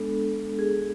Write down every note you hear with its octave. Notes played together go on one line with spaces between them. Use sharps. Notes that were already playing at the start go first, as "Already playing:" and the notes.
Already playing: G#3 B3 D4 A4
G#4